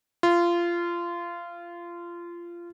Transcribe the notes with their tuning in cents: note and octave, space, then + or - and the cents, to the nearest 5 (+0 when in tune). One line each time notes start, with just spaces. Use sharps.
F4 -20